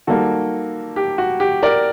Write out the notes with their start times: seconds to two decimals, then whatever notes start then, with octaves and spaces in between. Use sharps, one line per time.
0.07 D#3 G3 A#3 F#4 A4
0.96 G4
1.18 F#4
1.40 G4
1.63 A#4 D5